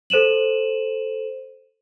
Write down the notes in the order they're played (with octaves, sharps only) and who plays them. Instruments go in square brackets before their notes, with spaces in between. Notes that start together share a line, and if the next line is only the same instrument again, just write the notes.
[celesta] A4 C5 D#7 E7 F#7